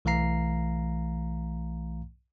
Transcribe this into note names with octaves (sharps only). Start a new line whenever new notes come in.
B1 E3 A3 F5 A#5 C7